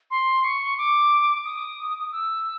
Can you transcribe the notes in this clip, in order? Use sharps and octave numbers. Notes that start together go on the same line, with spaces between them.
C6
C#6
D6
D#6
E6